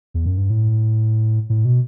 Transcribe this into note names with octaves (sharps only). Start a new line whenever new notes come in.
E2
F#2
G2
A2
A2
B2